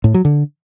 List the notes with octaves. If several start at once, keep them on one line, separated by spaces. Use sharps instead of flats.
A2
F#3
D3